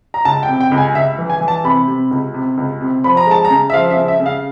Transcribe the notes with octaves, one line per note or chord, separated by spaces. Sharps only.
A#5
C#2 A5
G5
C3
G5
C#2
G#5
C#2 E5
E3
G#5
E3
A5
C3 B5
C3
C#2
C3
C#2
C3
F3 B5
A#5
G#3 A5
A#5
C#3
E5
F3 F5
E5
C#3
E5
C#3
F5